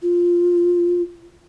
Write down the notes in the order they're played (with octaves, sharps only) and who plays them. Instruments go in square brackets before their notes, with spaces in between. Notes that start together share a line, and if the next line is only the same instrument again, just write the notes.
[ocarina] F4